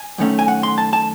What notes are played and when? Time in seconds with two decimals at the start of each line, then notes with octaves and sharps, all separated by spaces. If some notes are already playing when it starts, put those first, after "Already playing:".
Already playing: G#5
0.18 F#2 D#3 A3 C#4
0.39 G#5
0.48 F#5
0.63 C6
0.78 A5
0.93 A5